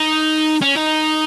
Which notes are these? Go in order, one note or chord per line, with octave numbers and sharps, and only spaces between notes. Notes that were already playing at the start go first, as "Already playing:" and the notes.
Already playing: D#4
C#4
D#4